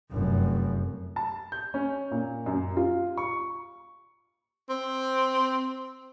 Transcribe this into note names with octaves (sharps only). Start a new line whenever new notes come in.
F1 F#2
A5
G6
C#4
A#2
F#2
F4
C#6
C4